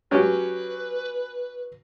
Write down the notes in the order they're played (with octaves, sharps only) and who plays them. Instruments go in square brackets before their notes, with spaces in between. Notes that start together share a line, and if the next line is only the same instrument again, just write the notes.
[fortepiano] F#3 C#4 G4 [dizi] B4